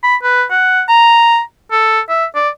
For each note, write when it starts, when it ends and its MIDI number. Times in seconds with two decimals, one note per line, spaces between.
0.03 0.16 83
0.23 0.44 71
0.51 0.82 78
0.88 1.40 82
1.72 2.00 69
2.09 2.25 76
2.35 2.49 74